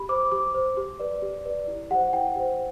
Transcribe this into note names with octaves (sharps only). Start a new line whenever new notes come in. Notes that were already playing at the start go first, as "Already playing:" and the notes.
Already playing: G4 B5
C5 D6
G4 D6
C5
G4
B4 D5
G4
B4 D5
E4
G4 C5 F#5
E4 G5
G4 C5